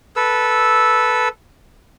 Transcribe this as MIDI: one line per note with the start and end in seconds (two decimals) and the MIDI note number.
0.16 1.28 69
0.16 1.28 71
0.16 1.28 88